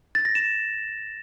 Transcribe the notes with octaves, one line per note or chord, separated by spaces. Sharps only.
A6
A#6
E7